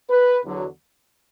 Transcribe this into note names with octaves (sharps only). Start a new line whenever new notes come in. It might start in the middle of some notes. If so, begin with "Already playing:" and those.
B4
E2 D3 F#3